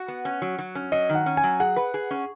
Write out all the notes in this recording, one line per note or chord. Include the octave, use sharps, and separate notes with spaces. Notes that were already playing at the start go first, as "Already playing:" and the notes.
Already playing: F#4 F#5
B3
C#4
F#3
F#3
C#4
F#3 D#5
D#3
F#5
C#4
G#5
F#3
G#4 F#5
B4
G#4
C#4